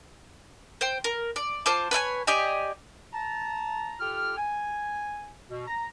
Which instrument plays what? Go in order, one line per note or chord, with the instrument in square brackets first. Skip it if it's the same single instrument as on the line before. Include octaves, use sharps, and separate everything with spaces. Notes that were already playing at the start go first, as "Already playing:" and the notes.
[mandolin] C5 G5
A#4
D5
F4 C5 A5 D6
B4 C#5 E5 G#5
G4 D5 D#5 G#5
[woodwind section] A5 A#5
F4 G4 A4 G5 F6
G#5
B2
A#5